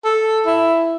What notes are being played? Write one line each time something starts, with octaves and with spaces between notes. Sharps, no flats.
A4
E4